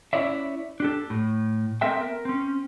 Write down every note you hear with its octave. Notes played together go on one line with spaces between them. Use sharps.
C#4 E4 C#5 D5 E5
D4 G4 A4
A2
B3 C4 A4 A#4 E5 G5
A#4
C4 C#4